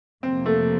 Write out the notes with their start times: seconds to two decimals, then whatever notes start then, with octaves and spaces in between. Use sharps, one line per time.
0.23 F2 C3 F3 A#3 C4
0.46 A3